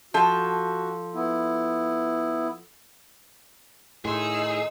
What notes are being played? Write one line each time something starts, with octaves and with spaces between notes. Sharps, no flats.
F3 F#4 A4
B3 E4
A2 D#3 D#4 G#4 C6 E6